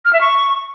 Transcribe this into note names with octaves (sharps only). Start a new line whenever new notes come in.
F6
E5
C#6